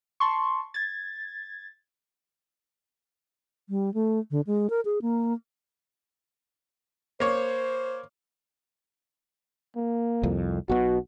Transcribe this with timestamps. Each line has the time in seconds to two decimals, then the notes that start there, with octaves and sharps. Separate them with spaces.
0.20 A5 C6 C#6
0.74 G#6 A6
3.69 G3
3.94 A3
4.31 D3
4.47 G#3
4.70 A#4
4.85 G#4
5.02 A#3
7.20 A#3 C5 C#5
9.76 A#3
10.23 C2 F2
10.69 B1 B2 F#4